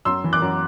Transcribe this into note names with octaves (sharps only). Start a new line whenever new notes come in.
F#2 C6 E6
E3
D6 F#6
F#2